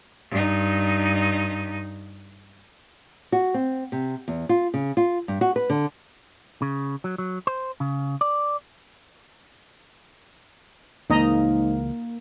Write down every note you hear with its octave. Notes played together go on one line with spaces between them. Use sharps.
G2 D#4
F#4
C4
C3
E2
F4
C#3
F4
G2
F#4
B4
D3
C#3
F#3
F#3
C5
C#3
D5
C#2 G#2 E3 A#3 D#4 D#5 A#5